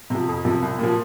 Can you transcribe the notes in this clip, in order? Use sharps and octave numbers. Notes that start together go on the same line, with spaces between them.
C3 F3
F2
C3 F3
C2
A#2 F3